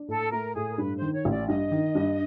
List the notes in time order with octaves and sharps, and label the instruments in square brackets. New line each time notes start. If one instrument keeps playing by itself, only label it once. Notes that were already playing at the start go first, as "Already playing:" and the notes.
Already playing: [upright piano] D4
[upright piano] A2 [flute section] A4
[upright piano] A3 [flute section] A#4
[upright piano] A2 [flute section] G#4
[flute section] A#4
[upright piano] G2 [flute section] B4
[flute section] C5
[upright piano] D#3
[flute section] C#5
[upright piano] A1
[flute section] D5
[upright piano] G2 [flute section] D#5
[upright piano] D#3
G2